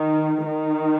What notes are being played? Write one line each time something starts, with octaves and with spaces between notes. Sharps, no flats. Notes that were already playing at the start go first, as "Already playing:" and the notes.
Already playing: D#3
D#3